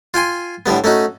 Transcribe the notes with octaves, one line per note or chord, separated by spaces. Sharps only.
F4 G5 G#5 C6
A2 D3 G3 B3
A3 C#4 D#4 F#4